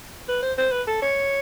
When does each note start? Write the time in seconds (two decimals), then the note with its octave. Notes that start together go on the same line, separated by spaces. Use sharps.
0.28 B4
0.42 C5
0.58 C5
0.71 B4
0.87 A4
1.02 C#5